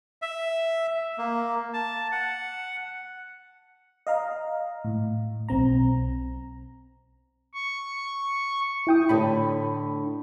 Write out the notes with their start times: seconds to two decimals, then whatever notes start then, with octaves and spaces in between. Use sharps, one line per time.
0.22 E5
1.18 A#3
1.73 A5
2.12 F#5
4.07 D#5 F5 A#5
4.84 A2
5.49 B1 C4 A#5
7.54 C#6
8.87 E4 G5 D#6
9.09 A2 D3 A4 B5